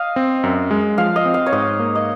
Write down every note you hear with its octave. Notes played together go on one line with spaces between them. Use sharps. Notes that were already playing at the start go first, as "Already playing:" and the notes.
Already playing: D#5 F5
C4
F#2
G#3
F3 F5
D#5
C4
F5
C#5
G#2 D#5
A#3
D#5